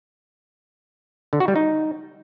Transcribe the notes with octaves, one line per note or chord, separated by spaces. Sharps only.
D3
F#4
G3
D#4